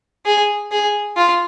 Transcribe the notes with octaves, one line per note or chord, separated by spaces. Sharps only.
G#4
G#4
F4